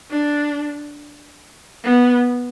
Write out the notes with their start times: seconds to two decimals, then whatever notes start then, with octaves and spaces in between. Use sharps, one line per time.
0.11 D4
1.84 B3